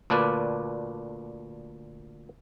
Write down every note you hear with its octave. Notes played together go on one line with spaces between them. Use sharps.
D2 A#2 D4 B4 D5